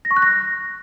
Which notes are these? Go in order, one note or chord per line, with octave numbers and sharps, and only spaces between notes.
A#6
C#6
F#6
A#6